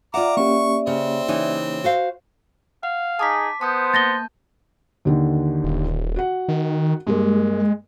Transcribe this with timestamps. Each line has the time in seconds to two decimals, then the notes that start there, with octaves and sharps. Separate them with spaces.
0.14 F4 D5 E5 F#5 A#5 D6
0.37 A#3 C#4 G4 C#6
0.87 C#3 C4
1.28 C#3 E3 D#4
1.84 F#4 C5 F5
2.83 F5 F#5
3.19 D#4 G#4 A5 D6 B6
3.61 B3 C5 A5 D#6 G6
3.94 A#3 A5 G6 A6 A#6 G7
5.05 D#2 D3 D#3
5.64 D#1
6.16 F#4 F#5
6.48 D#3
7.07 G2 G#3 A#3